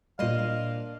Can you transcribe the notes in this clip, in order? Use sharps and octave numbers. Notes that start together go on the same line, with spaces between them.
A#2 G3 A#3 D4 C5 D#5 F5